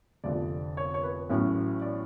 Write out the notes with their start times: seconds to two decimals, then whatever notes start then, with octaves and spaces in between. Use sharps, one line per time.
0.24 F1 F2 D3 D5
0.77 C#5
0.94 C#5
1.03 B4
1.29 A1 A2 F#3 C#4
1.81 D5